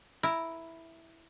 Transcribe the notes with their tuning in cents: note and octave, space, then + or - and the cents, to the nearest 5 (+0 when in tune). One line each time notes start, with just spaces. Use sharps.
E4 +0 A#4 +0